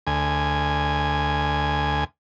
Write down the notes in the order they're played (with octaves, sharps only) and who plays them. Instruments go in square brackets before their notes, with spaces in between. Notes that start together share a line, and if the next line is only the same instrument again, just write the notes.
[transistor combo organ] D2 G#5